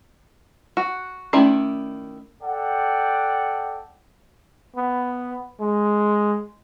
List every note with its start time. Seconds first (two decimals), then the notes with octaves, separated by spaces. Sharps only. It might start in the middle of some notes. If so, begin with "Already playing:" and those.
0.77 F#4
1.33 D#3 A3 C#4 E4 D5
2.43 A4 D5 F#5 G5
4.76 B3
5.60 G#3